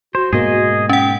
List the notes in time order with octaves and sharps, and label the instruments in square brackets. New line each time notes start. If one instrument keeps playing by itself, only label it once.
[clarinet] F#4 [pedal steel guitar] C5
[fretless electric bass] G#2 B2 A#3 [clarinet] F#4 [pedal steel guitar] G#4 D#5
[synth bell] C#4 F#5 [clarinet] G5